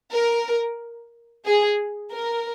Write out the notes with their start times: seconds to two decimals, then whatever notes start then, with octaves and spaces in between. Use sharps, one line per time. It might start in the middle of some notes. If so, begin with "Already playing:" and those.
0.13 A#4
1.46 G#4
2.11 A#4